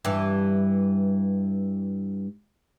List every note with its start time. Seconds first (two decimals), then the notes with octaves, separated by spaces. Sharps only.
0.05 G2 E3